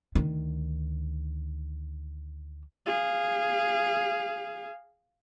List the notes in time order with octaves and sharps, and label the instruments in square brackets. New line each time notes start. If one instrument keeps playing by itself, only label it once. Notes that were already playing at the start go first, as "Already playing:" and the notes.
[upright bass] D2 D#3
[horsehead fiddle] G#4 F5